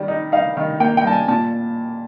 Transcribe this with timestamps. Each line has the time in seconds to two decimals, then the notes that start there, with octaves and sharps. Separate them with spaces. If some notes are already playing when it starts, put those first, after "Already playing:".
Already playing: D#3 G3
0.08 D#4
0.32 D#4 F5
0.57 D#3
0.80 A#3 G5
0.97 G5
1.04 G3 A5
1.12 G#5
1.28 A#2 A5